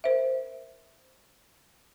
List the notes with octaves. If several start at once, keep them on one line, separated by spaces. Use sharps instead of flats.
A#4 C5 E5